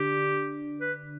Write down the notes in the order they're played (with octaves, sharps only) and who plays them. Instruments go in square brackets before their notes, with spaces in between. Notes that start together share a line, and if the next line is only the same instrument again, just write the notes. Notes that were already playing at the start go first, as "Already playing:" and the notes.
Already playing: [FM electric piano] D3 D4 [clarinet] G4
[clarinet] B4